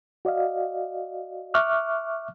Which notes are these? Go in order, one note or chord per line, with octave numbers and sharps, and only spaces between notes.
F#4 D5 D#5 F5
E5 C#6 D6 F6 F#6